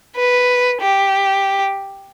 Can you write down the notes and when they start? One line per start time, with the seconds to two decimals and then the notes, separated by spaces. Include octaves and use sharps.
0.16 B4
0.82 G4